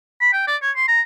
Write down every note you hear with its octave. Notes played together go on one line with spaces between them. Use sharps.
B5
G5
D5
C#5
C6
A#5